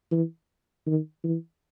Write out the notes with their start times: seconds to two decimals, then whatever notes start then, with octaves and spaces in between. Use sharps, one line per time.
0.12 E3
0.87 D#3
1.24 E3